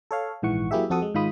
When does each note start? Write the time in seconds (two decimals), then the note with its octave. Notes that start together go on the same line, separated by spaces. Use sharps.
0.11 A4 C#5 F5
0.42 A#1 G#2 E3 F#5 C#6
0.71 F#3 A#3 E4 G4 G#4 E5
0.90 F2 C4 F#4 A4 F#5 D#6
1.02 G#3
1.14 G#2 D#3 G#3 F4 B5 D#6